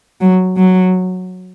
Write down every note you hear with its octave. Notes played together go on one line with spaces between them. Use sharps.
F#3
F#3